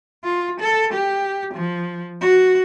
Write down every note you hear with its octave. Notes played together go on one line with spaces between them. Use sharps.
F4
A4
G4
F3
F#4